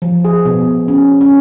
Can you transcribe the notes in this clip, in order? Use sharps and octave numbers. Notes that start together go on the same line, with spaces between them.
F3
G#4
B2
C#4
C#4